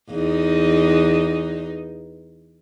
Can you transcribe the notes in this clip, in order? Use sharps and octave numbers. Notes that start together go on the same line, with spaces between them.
E2 D#4